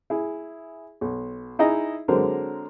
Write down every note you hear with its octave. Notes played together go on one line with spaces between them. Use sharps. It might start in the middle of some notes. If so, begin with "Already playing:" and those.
E4 G#4
B1
D#4 E4 G#4 D#5 A#5
D3 F#3 G#3 C4 A#4 C5